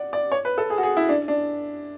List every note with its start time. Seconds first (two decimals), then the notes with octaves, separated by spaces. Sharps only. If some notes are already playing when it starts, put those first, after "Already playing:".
Already playing: D5 F#5
0.13 D5
0.32 C#5
0.45 B4
0.58 A4
0.70 G#4
0.78 F#4
0.83 G#4
0.97 E4
1.09 D4
1.28 D4